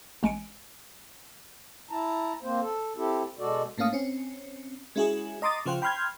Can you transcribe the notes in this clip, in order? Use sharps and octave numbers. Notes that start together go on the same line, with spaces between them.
A1 G#3 G#5 C#7 D7
E4 A5 A#5
A#3 C4 C5
A4
C4 E4 G4 A4
B2 G#3 F#4 A4 D5
A2 A3 A#3 C#4 F5 D#6
C4 C#4
G#3 C#4 E4 F#4 G#4
D#5 A#5 C6 D6 D#6 A6
C#3 F3 F4 C5 F#5 G5
G5 B5 C6 F6 G6 G#6